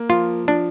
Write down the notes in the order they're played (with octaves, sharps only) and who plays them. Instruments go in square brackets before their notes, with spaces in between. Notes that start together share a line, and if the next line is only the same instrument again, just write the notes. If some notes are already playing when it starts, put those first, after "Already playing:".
Already playing: [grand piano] A#3
[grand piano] F3 [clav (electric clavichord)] F4
[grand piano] F3 [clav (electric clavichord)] D4